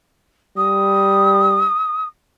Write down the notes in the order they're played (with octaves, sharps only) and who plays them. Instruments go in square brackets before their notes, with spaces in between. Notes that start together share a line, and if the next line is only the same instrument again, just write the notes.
[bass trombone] G3 [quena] D#6